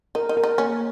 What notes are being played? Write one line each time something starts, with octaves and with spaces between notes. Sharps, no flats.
D#4 A#4
D#4
A#4
D#4
A#3 C#4